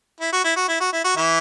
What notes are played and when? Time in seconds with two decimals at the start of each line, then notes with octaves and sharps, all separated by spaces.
0.21 E4
0.33 F#4
0.44 E4
0.56 F#4
0.68 E4
0.80 F#4
0.93 E4
1.04 F#4
1.17 E3 E4